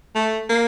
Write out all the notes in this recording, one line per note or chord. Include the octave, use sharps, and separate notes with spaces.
A3
A#3